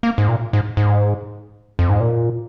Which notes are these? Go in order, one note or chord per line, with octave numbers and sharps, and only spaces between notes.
A#3
G#2
A#2
G#2
G#2
F2
G#2
A#2